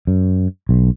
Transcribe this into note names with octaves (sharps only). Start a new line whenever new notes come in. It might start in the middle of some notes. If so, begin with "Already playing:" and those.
F#2
B1